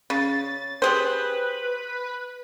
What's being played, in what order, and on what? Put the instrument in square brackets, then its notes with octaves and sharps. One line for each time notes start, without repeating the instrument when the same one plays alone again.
[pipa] C#3 [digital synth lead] A6
[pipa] G4 G#4 C5 [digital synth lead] B4